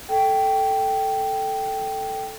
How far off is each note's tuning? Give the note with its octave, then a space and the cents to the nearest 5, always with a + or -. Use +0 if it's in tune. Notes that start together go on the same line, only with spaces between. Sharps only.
A4 +0 G5 -5